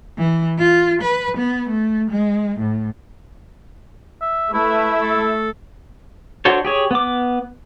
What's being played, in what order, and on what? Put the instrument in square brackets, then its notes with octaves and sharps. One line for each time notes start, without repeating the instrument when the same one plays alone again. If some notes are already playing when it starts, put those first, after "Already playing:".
[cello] E3
F4
B4
B3
A3
G#3
A2
[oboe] E5
[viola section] A3 E5 [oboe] E4 [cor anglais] B4
[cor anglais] A4
[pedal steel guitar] D4 F#4 A4 C5 C#5
G4 G#4 C#5
B3 D6